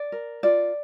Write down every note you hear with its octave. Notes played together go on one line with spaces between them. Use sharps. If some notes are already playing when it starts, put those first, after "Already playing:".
Already playing: D5
A#4
F4 D5